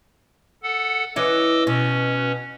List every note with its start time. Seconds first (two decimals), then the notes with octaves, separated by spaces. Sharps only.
0.63 A4 F#5
1.16 E3 C#4 E4 D#5 D6 E6
1.67 B2 C#4